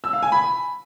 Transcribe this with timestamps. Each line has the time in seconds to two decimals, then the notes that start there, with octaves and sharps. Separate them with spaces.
0.04 E6
0.13 F5
0.22 G#5
0.32 B5